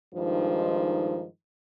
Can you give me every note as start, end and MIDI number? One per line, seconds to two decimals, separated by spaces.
0.14 1.25 43
0.14 1.25 51
0.14 1.25 53
0.14 1.25 56
0.14 1.25 63